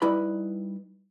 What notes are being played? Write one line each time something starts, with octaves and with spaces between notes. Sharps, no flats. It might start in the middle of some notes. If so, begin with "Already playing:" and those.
G3 D#4 E4 B4 B5